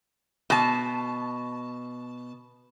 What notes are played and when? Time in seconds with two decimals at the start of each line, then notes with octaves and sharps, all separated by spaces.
0.50 B2 A5